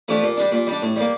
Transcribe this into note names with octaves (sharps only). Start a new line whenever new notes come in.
F3 A3 D4 G4
A#2
G3 D4
A#2
G3 D4
A2
G3 A#3